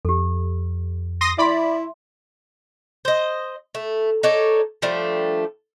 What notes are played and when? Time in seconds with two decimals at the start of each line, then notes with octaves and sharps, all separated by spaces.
0.05 F2 G4 A4
1.21 C6 D#6 A#6
1.38 E4 D5 E5 B5 C6
3.05 C5 D#5
3.75 A3
4.23 D#4 A4 C#5 D5
4.82 F3 G3 A3 D4